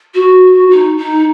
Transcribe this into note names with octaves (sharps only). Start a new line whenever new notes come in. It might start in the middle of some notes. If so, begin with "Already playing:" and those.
F#4
D#4
D#4